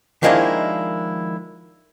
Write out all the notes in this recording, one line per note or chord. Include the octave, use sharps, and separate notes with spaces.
D#3 F3 G#3 A#3 D4 E4